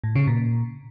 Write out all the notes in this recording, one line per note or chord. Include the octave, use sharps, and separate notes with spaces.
A2
C#3
A#2